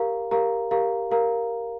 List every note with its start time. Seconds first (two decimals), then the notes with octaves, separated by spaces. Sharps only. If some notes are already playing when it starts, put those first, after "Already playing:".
Already playing: G4 A#4 F5 A#5
0.31 G4 A#4 F5 A#5
0.71 G4 A#4 F5 A#5
1.11 G4 A#4 F5 A#5